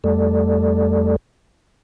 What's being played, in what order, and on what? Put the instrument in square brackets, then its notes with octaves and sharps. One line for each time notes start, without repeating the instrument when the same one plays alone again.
[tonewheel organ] F2 G3 A3 A4 D5